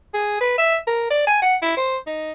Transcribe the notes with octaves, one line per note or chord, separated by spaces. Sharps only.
G#4
B4
E5
A#4
D5
G#5
F#5
E4
C5
D#4